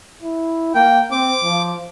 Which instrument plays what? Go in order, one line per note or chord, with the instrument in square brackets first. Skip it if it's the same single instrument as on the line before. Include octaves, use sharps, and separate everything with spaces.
[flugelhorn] E4
[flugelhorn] A#3 [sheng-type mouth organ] G5
[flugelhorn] C4 [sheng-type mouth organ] D6
[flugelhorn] F3